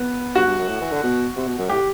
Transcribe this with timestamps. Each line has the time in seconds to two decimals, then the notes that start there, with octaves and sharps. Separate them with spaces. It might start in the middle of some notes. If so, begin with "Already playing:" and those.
Already playing: B3
0.35 G2 F#4
0.46 G2
0.58 F#2
0.69 A2
0.81 E3
0.92 D3
1.03 B2
1.36 C3
1.47 B2
1.58 F#2
1.69 A2 G4